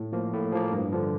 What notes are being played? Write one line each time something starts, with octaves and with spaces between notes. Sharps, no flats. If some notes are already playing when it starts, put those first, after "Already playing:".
Already playing: A2
F3 A#3
A2
F3 A#3
G2
D3 F3